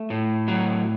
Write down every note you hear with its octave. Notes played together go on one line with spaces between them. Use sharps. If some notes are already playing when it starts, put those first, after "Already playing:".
Already playing: A3
A2
F#3